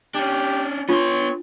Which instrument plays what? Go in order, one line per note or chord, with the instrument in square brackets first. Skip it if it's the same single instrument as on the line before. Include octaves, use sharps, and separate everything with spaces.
[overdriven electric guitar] C#4 D4 [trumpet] G4
[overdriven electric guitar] B3 C6 [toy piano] D4 F4 [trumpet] C#5